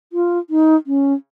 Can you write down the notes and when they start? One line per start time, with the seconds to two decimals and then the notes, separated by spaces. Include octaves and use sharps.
0.13 F4
0.50 D#4
0.87 C#4